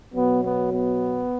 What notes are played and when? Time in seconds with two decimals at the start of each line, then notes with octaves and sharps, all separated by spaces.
0.14 B2 F#3 B3
0.43 B3
0.72 B3